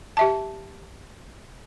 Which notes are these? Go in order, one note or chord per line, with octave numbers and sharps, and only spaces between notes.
G4 E5 A5